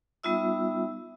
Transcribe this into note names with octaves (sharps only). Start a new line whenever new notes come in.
G3 B3 D#4 F4 E5 E6